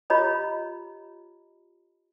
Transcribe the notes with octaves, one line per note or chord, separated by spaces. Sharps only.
F4 G4 C#5 D#5 A#5 B5